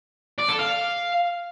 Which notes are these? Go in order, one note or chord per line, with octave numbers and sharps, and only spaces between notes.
D5
A4
F5